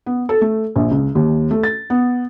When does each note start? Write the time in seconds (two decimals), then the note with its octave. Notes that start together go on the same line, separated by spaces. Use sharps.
0.06 B3
0.29 A4
0.41 A3
0.76 A#1
0.91 C#2
1.15 D#2
1.51 A3
1.63 A6
1.90 B3